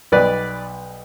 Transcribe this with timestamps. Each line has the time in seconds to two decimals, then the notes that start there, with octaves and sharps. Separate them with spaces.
0.12 B1 B2 G3 B3 B4 D5